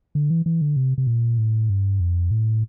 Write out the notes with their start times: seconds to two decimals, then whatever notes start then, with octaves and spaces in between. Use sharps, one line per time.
0.15 D3
0.30 E3
0.46 E3
0.61 D3
0.76 C3
0.98 C3
1.07 A#2
1.38 A2
1.70 G2
2.00 F2
2.31 A2